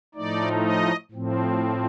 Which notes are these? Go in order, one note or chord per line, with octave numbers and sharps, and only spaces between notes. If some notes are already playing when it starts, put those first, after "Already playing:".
A2 F3 A3 D#4 D5
D#5
A2 F3 C4